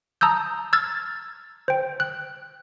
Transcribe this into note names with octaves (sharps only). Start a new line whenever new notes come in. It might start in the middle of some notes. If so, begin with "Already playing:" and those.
A5 A#5 D#6 E6 G6
E6 F6 G#6 A6
C5 G5
F#6